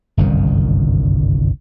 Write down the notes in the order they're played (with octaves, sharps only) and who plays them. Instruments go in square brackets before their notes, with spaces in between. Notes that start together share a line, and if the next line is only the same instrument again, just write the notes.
[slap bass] G1 C2 F#2 D#3